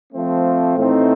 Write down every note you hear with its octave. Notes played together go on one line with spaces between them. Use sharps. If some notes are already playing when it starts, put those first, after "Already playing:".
F3 A3 C4
A2 E3 A3 C4 D#4